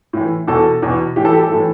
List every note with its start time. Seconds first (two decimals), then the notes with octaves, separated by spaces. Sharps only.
0.13 A2 E3
0.48 E2 B2 A4
0.83 E2 B2
1.16 A2 E3 G4
1.25 A4
1.33 G4
1.43 A4
1.52 A2 E3